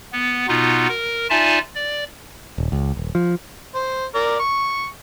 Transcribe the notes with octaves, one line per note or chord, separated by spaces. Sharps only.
B3
B2 B3 D#4 F4
A#4
D#4 F4 D5 E5 G#5 A5
D5
D#1
C#2
D#1
F3
C5
A#4 D5
C#6